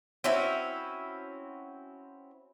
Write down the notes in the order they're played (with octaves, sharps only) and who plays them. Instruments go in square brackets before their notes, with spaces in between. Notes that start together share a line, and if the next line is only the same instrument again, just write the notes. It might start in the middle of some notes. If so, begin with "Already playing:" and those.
[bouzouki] C4 C#4 E4 F#4